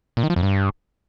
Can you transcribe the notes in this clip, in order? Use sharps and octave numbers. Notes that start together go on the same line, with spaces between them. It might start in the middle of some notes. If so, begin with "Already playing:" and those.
A#2
D#3
F3
F2
G2